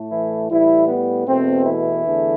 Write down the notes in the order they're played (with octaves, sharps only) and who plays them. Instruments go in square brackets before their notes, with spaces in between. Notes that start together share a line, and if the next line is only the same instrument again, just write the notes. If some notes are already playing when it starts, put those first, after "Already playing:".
Already playing: [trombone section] A2 A3
E3 E4
A2 E3 G3 E4
B3
E2 B2 A3 C4
E3 E4
E2 D3 A3